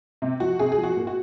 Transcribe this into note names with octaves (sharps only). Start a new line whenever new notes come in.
C3
F3 F#4
C3 G#4
G#4
F3
F#4
A#2
F#4